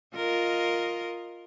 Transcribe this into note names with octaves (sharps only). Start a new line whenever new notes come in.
F4 A#4 D#5